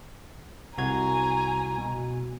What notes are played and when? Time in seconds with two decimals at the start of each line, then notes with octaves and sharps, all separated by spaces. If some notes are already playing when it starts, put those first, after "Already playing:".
0.78 C2 F#4 G#5 A#5 G#6
1.78 B2